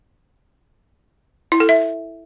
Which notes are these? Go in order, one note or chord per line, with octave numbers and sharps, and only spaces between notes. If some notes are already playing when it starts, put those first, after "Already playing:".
E4
A4
E5